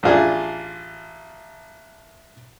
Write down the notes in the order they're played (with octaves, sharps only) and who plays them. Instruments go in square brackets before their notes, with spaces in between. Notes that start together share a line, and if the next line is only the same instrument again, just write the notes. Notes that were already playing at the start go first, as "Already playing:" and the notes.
[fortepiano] A1 D4 F4 G#4